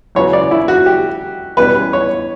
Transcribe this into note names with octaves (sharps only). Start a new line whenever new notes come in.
E2 C#3 F#3 B3 C#5
D5
E4
F#4
G4
E2 B2 G3 C#4 B4
C#5